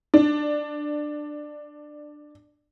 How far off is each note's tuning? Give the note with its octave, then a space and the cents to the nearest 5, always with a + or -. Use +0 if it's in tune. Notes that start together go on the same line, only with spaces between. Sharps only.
D4 +10